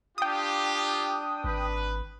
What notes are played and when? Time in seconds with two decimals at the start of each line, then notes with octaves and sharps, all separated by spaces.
0.18 D4 F4 G4 G5 D#6
1.44 G#1 B4